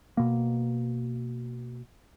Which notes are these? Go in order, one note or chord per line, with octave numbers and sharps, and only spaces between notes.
B2 A#3